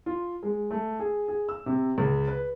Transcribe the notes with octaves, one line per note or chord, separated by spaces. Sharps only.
F4
G#3
A3
G#4
G#4
E6
C3
C#2
B4